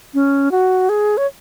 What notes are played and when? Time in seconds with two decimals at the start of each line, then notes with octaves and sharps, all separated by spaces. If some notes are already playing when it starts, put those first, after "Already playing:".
0.14 C#4
0.51 F#4
0.89 G#4
1.17 C#5